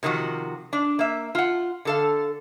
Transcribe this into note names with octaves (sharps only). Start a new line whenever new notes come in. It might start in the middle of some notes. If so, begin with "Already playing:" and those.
C3 D#3 F3 F#4
D4
A#3 E5
F4 F#5
D3 A4 F5